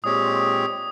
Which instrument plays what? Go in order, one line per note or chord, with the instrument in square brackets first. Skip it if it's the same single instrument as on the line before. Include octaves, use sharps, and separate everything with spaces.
[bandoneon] A#2 G#3 C4 G4 C#5 [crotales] D#6
[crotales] D#6